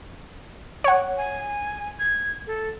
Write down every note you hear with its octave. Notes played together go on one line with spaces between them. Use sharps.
C#5 F#5
G#5
G#6
A4